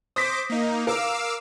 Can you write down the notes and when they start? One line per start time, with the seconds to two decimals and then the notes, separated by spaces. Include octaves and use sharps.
0.16 C5 D6 D#6 A#6 B6
0.49 A#3 D#4
0.87 A#4 F5 D6 E6